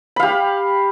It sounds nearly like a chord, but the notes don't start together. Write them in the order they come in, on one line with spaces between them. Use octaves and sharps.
B5 F5 G4